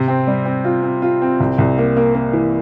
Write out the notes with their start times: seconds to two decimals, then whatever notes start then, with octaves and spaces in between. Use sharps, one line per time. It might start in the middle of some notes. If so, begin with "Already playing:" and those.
Already playing: C3
0.08 C4
0.27 G3
0.46 C4
0.65 F4
0.83 C4
1.02 F4
1.22 C4
1.40 C2
1.58 C2
1.78 A#3
1.97 A#3
2.15 A#3
2.33 E3